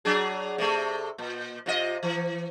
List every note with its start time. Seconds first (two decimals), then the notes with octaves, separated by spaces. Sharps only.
0.05 F#3 D4 G#4
0.58 C3 A3
1.18 A#2
1.66 C3 F4 D#5
2.03 E3